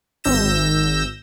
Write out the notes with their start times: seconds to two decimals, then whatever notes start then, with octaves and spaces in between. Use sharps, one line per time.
0.24 G#1 E6 G6 A#6 E7